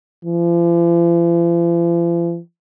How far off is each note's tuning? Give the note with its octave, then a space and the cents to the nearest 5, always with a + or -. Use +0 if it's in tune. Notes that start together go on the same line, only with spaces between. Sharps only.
F3 -45